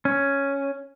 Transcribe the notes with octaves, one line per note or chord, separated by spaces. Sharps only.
C#4